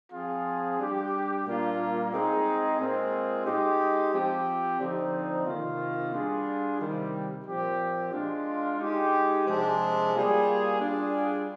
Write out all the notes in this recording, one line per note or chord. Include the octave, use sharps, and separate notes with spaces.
F3 C4 F4 G#4
G3 D4 G4
A#2 G3 A#3 D4 F4
G#3 C4 D#4 G#4
A#2 G#3 C4 F4 G#4
G#3 D#4 G4
F3 C4 G4
D3 F3 C4 D#4
C3 D#3 A#3 F4
G3 D4 F4 G#4
C3 D#3 G3
A#2 F3 C4 G4
G#3 D4 F4
G#3 D#4 G4
C3 F3 G#3 D4 G#4
G3 A#3 F4 G#4
G3 D4 F4 G#4